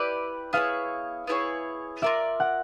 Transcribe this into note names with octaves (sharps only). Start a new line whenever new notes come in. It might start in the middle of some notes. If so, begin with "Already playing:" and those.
Already playing: E4 G4 B4 D5
B3 E4 G#4 C#5 F5
B3 E4 G#4 C#5
F4 A#4 D5 E5
F#5